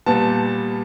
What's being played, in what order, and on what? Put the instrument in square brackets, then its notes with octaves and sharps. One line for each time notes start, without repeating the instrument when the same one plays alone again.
[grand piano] A#2 G3 B3 A5